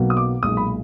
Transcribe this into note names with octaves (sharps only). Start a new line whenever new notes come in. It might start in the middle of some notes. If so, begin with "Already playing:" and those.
Already playing: B1 B2 F#3 A#3
D#6
D6
B1 A#2 G#3 D#6
B5